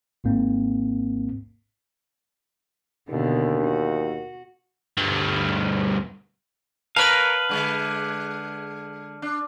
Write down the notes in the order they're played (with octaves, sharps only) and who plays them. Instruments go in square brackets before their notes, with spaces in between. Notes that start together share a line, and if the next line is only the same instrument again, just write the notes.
[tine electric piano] G#1 G#2 A#3 C4
[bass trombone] D#2 [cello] B2 D3
[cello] F#4
[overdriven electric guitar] D2 G2
[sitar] A#4 C#5 [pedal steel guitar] B4 F5 [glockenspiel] A5 F6 D#7
[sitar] D3 G#3
D4